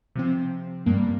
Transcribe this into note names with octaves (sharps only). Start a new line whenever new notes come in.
C3 F3 C4
G2 G3 A#3